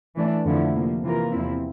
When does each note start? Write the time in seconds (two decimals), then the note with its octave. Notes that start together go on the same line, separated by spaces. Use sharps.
0.16 E3 A3 D4
0.45 F2 D3 F3 A3 E4
0.74 C3 F3 A#3
1.02 C3 E3 A#3 F4 A#4
1.32 E2 C3 F3 C4 E4